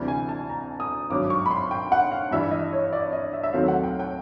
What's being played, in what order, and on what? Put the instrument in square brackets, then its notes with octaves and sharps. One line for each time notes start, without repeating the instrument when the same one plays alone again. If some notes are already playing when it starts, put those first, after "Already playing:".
Already playing: [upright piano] D2 C3 E3 G3 D5
G#5
A5
A#5
D#6
G#1 G2 D#3 F#3 D6
C#6
B5
C6
G5
F#5
F5
G2 E3 G3 E5
D#5
C#5
D5
D#5
E5
E5
D#2 D#3 F#3 A3 C4 F5
F#5
G5
G5